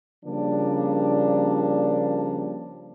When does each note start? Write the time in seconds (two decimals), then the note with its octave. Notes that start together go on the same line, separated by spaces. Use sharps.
0.25 C#3 F3 G3 A#3 D4